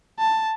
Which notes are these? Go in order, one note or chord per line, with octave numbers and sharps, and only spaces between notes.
A5